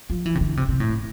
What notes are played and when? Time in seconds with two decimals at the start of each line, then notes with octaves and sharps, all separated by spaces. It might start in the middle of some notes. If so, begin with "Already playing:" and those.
0.10 F3
0.26 E3
0.35 C3
0.41 D3
0.57 C3
0.69 C3
0.80 A2